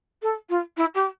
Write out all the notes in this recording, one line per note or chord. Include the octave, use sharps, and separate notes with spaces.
A4
F4
E4
G4